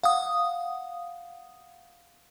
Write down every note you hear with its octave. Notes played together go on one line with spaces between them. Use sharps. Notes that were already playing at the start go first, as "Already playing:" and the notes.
F5 F#5 D#6